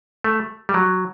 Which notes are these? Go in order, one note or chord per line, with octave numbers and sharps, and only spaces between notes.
A3
G3
F#3